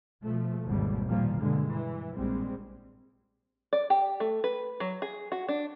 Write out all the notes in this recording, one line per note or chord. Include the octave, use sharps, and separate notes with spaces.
B2 F3 A3
G#1 D#2 G#2 B2 E3 G3
A#2 D#3 F3 G3 A#3
G2 B2 D3 G#3
E3
A#1 G3 G#3 C4
D5
G4
A3
B4
F#3
G#4
F#4
D4